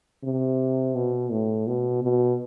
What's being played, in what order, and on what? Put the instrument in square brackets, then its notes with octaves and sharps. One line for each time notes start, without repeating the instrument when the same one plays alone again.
[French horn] C3
B2
A2
B2
B2